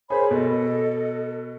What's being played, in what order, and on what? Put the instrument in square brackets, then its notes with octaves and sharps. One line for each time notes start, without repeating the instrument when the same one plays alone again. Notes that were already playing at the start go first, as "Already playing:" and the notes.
[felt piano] G#4 C5 [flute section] A#4 C#5 B5
[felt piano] B2 [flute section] A4 D#5